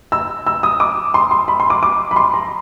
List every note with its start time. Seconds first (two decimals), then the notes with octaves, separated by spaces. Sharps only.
0.12 E6
0.47 E6
0.63 D#6
0.80 D6
1.14 C6
1.31 C6
1.48 B5
1.60 C6
1.70 D6
1.83 D6
2.11 B5
2.16 C6
2.34 A#5